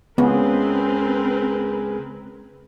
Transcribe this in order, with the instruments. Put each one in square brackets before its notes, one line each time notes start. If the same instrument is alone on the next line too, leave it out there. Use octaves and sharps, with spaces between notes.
[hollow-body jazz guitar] C#2 [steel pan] B3 [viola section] C4 A#4 B4 [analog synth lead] G#4